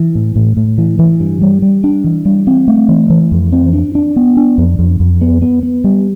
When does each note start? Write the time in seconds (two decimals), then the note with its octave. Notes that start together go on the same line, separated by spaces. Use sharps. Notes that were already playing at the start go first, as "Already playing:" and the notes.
Already playing: E3
0.15 A2
0.36 A2
0.57 A2
0.78 E3
0.99 E3
1.20 G2
1.42 G3
1.62 G3
1.84 D4
2.04 E3
2.25 G3
2.47 C4
2.68 A3
2.89 E3
3.10 E3
3.31 F2
3.52 C4
3.73 D4
3.95 D4
4.16 B3
4.37 D4
4.58 F2
4.79 F2
5.00 F2
5.21 B3
5.42 B3
5.63 B3
5.84 G3